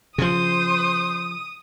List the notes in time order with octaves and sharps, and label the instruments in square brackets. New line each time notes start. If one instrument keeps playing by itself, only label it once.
[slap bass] C#3 F3 [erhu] C5 [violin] D#6